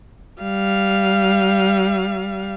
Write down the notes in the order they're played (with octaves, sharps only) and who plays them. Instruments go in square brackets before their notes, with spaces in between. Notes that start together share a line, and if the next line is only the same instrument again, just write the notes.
[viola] G3 F5